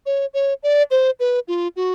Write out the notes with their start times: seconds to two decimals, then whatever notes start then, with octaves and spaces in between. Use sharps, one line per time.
0.06 C#5
0.34 C#5
0.63 D5
0.91 C5
1.20 B4
1.48 F4
1.76 F#4